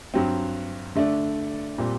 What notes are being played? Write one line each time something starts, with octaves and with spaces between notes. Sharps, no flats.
G2 F#3 C4
D3 A3 D4
A#2 G3 C4 G4